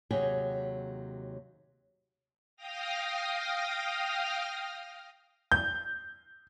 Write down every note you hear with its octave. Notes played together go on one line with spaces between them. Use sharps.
D#2 C3 F#3 G#4 G5
F5 G5 D#6 F6 A#6
G6